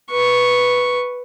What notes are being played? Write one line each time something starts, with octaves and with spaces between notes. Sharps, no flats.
B4 C#6